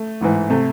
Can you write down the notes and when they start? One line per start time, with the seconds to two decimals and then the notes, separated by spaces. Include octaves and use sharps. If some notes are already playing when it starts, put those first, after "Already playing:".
Already playing: A3
0.21 A1 G#2 E3
0.50 C3 A3